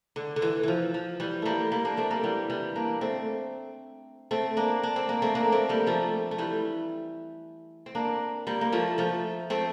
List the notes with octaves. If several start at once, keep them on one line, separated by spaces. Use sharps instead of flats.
D3
D3
E3
E3 F3
F3
E3 G3
G3 A3 A#3
G3 A#3
A#3 D4
A3 C4
G3 A#3
E3 G3
E3 G3
A#3 D4
A3 C4
A3 C4
A#3 D4
D4
C4
A#3
A3 C4
A#3 D4
A3 C4
G3 A#3
F3 A3
A3
E3 G3
C4
A#3 D4
G3 A#3
A#3
F3 A3
F3 A3
A3 C4